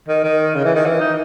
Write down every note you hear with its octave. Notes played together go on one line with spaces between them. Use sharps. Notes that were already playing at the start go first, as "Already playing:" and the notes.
D#3
D#3
C#3
E3
D#3
E3
D#4